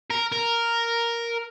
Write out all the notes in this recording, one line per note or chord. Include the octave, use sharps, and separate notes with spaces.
A#4
A#4